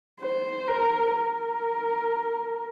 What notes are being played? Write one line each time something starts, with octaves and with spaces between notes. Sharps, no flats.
C5
A#4
A#4